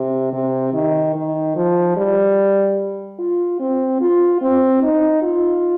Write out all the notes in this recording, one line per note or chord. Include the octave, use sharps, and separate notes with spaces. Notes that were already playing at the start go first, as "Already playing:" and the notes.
Already playing: C3
C3
D#3
D#3
F3
G3
F4
C4
F4
C4
D#4
F4